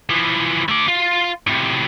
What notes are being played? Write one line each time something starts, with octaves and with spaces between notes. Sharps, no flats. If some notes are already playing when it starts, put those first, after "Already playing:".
E3 F3
A3 D5
F4
A2 C3